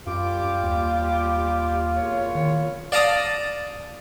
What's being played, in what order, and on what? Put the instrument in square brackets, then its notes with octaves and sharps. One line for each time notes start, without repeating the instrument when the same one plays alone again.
[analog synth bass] F#2 [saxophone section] G3 G4 [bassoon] F4 [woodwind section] D6
[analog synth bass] D#2
[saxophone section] E2 A#2 C#5
[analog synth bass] D#3
[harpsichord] D5 F5 A5 A#5 D6 D#6